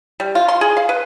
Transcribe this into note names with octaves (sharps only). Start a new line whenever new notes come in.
G3
F4
C6
G#4
F5
B4